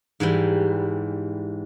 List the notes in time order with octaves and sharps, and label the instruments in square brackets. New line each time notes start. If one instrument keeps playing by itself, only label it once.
[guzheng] G#2 E3 G3